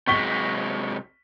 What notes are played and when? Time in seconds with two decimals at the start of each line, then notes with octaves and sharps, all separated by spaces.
0.07 C3 F#3 G#3 C#6 B6 G7